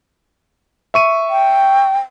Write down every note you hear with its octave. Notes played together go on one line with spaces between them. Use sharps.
E5 C#6 D#7
G5